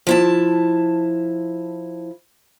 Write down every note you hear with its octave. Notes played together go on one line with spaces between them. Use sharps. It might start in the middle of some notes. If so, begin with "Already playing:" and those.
F3 E4 A5